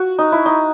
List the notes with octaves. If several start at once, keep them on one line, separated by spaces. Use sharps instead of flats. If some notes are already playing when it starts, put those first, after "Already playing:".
Already playing: F#4
D#4
E4
D#4